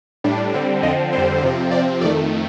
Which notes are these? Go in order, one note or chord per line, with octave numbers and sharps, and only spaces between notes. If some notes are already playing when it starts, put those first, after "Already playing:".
A2 G3 D4
D3 G3 C4
F2 D3 F3 C4 D#5
F2 D3 G3 C4 C5
F2 C3 F3 C4
C3 F3 C4 D5
F2 D#3 A3 D5